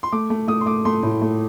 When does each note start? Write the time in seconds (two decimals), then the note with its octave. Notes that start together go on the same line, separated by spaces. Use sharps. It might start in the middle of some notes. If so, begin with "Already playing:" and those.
0.03 C6
0.12 A3 D6
0.30 A3
0.48 A3 D#6
0.61 C6
0.66 A3 D6
0.85 A3 C6
1.03 A2
1.21 A3